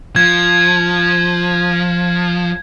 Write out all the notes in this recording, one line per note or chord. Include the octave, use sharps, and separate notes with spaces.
F3 G#6